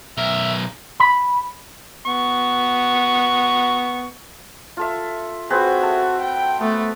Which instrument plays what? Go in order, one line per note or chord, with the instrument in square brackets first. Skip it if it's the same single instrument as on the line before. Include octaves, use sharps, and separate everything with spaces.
[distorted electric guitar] B1 A#4 [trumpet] E5
[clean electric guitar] B5
[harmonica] B3 C#6
[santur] F4 A4 E5
[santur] C4 G#4 B4 [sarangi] F#4
[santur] A4 E5
[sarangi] G5
[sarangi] A3 [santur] B3